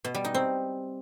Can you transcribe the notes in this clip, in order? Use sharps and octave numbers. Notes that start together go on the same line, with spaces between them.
B2
G3
D#4
C4